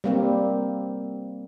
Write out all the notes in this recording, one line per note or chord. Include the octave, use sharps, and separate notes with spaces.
G3 A#3 C4